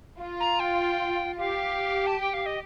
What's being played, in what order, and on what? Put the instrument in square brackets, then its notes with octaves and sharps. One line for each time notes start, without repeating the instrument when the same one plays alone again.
[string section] F4
[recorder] A#5
G5
[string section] G4 [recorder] F5
[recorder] A5
G5
F5
D#5